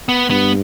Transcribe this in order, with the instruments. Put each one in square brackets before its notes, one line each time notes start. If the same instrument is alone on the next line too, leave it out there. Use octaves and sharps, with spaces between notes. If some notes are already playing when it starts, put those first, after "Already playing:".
[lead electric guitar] B3
[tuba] G2 [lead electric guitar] B3